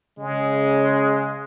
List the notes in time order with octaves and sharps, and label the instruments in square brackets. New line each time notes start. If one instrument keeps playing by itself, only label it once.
[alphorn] C#3 [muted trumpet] G#3